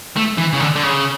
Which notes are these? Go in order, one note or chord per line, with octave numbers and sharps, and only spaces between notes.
A3
E3
C#3
D3
D3
C#3